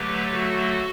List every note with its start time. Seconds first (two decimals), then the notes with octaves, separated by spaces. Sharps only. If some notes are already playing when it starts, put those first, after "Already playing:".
Already playing: D3 F#3 A3 G4 B4
0.31 F#4 A4